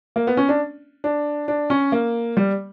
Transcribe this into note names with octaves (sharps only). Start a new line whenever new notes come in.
A#3
B3
C#4
D4
D4
D4
C#4
A#3
G3